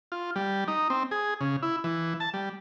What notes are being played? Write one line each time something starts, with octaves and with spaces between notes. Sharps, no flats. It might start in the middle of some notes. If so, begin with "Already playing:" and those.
F4
G3
D#4
C4
G#4
C#3
E4
E3
A5
G3